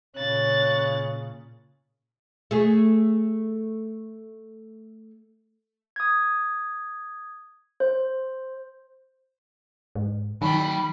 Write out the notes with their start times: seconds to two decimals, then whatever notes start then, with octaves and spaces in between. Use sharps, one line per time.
0.16 A#2 C#3 C#5 F#6 A6
2.51 A3 G#4
5.96 D#6 G#6
7.80 C5
9.95 G#2
10.42 D#3 F#3 D#4 G5 B5